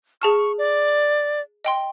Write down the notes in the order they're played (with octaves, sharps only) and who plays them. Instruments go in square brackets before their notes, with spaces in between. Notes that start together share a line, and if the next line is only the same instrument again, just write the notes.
[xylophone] G#4 A5 F6 [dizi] C#6
[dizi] D5
[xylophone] D#5 G5 C6